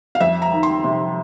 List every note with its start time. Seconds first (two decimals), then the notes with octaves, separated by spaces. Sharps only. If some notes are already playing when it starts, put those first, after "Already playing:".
0.15 F5
0.20 F2 E5
0.42 A#5
0.52 D#3
0.63 C6
0.84 C3